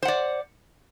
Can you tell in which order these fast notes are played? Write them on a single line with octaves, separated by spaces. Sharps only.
C5 F#5 D5